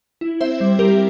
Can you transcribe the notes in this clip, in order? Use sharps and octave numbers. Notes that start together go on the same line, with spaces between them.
E4
C4 C5 E5
G3
G3 G4 A#4